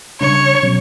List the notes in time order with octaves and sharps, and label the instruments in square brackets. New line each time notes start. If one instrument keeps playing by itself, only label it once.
[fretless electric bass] C#3 G3 D4 [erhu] C#5
[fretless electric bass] B2 F#3 C#4